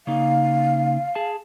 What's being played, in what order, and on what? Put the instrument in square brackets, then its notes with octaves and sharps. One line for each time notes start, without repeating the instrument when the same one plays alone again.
[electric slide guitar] C#3 A#3 D#4 [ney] F5
[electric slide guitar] G#4 A5